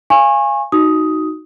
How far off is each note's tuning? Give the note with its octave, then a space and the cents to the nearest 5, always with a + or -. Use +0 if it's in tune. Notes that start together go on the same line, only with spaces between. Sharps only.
F5 -20 G#5 -15 C#6 -30
D#4 +0 F#4 +0 D#6 +10